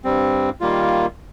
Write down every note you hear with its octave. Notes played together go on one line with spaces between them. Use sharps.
G2 G3 C4
D#3 G3 A#3 F4